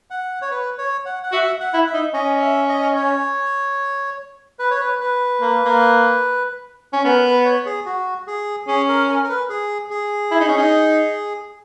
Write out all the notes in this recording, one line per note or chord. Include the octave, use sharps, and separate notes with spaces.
F#5
C#5
B4
C#5
F#5
F#5
F#4 E5
F#5
E4
E5
D#4
C#4 D#5
E5
D#5
C#5
B4
C#5
B4
B4
A#3
A#3
C#4
B3 A#4
B4
C#5
G#4
F#4
G#4
C#4 G#4
A#4
A#4
A#4
B4
G#4
G#4
E4
D#4
C#4
D#4